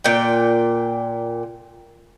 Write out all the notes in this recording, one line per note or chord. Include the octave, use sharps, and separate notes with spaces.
A#2 G5